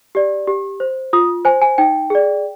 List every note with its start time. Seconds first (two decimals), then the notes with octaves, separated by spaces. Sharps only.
0.15 G4 D5
0.47 G4
0.80 C5
1.13 F4 D#6
1.45 C5 G#5
1.62 G#5
1.78 D#4 G5
2.10 G#4 D5